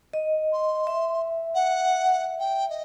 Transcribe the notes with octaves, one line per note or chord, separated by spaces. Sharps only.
D#5
C6
E5
F#5
G5
D#5